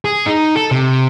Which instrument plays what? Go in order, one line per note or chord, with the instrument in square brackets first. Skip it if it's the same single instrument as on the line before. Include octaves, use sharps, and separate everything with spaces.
[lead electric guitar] G#4
D#4
A4
C3